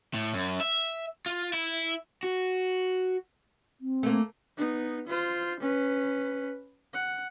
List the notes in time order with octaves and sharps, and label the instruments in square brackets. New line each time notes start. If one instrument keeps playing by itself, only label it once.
[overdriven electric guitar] A2
F#2
E5
F4
E4
F#4
[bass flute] C4
[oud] A3 A#3
[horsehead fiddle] B3 D#4
F4 C5
C#4 B4
F#5